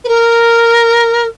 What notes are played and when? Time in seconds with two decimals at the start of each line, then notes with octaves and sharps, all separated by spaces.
0.04 B4
0.08 A#4